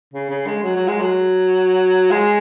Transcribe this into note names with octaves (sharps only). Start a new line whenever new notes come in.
C#3
C#3
G#3
F#3
F#3
G#3
F#3
G#3